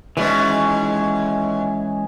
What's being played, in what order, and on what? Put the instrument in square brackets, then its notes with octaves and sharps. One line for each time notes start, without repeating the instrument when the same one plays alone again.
[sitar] D#2 B2 [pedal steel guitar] E3 G#3 C#4